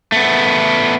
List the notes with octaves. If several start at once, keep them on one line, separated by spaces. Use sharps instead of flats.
A3 B3